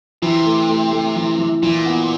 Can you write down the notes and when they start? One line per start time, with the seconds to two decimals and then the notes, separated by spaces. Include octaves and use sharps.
0.22 C3 E3
0.46 A3
0.69 A3
0.93 A3
1.16 E3
1.39 E3
1.62 A#2 E3
1.86 B3